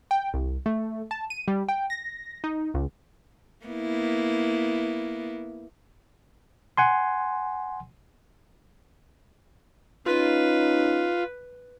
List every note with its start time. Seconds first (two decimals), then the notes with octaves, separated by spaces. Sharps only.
0.11 G5
0.34 C2
0.66 A3
1.11 A5
1.30 D#7
1.48 G3
1.68 G5
1.90 A#6
2.44 D#4
2.74 C#2
3.66 A#3 B3 E4
6.77 F#5 G#5 C6
10.06 C#4 D#4 F4 B4